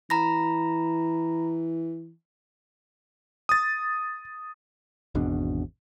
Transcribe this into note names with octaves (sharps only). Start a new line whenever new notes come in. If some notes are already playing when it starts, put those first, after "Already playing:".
E3 A#5 B5 A#6
D#6 A6
G#1 E2 B2 D4